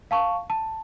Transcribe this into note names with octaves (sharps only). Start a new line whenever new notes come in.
F5 A5 C#6
A5